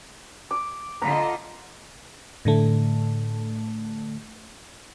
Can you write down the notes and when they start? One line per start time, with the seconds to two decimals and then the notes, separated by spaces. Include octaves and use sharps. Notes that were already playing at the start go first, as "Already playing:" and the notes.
0.51 D6
1.01 D3 F4 D#5 A#5 B5
2.45 A2 D3 A3